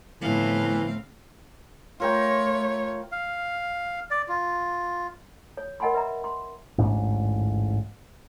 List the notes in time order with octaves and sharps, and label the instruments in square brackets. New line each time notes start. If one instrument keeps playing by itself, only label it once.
[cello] A2 A3 [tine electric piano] D3 F3 B3 [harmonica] E3 [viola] C4 F5
[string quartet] A3 C#5 [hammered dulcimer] F4 A#4 G5
[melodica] F5
D5
F4
[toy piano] C#5
A#4 D#5 F#5 G#5 B5 C6
B4 E5 A#5
C6
[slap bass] A1 D2 G#2 D4